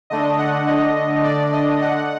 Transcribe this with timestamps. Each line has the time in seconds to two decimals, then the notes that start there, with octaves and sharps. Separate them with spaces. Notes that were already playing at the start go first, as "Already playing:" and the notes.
0.10 D3 A3 D4 D#5
0.39 F#5
0.67 D#5
1.24 D5
1.53 D#5
1.82 F#5